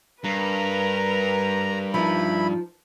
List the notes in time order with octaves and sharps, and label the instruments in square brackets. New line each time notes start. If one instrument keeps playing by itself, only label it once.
[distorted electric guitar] G2 [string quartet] A#4 B4 [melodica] A#5
[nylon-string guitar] F3 D#4 [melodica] E4 B5